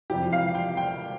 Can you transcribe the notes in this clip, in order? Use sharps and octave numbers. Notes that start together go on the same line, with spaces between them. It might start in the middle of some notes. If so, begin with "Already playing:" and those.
F2 C3 E3 G4
F5
G5
G5